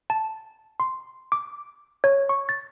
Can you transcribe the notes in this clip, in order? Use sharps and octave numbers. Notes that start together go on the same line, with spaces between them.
A5
C6
D6
C#5
C#6
A6